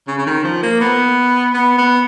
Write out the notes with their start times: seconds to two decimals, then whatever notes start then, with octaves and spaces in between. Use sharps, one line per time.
0.08 C#3
0.18 C#3
0.27 D#3
0.44 F3
0.63 A#3
0.81 B3
1.54 B3
1.78 B3